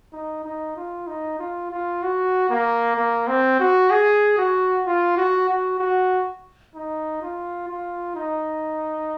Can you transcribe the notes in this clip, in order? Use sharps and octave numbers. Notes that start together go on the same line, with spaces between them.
D#4
D#4
F4
D#4
F4
F4
F#4
A#3
A#3
C4
F#4
G#4
F#4
F4
F#4
F#4
F#4
D#4
F4
F4
D#4